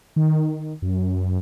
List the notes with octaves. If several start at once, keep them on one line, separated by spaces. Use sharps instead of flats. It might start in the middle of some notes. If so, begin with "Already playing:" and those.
D#3
F#2